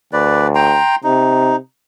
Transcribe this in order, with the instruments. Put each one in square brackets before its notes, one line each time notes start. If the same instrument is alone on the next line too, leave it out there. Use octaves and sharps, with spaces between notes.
[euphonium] D2 [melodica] B4 D5
[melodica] G5 A#5 C6
[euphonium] C3 [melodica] D#4